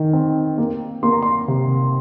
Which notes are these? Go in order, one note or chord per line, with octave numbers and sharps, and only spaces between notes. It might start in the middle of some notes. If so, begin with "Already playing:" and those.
Already playing: D#3
C4
A#3
A#3 C6
A#5
C6
C3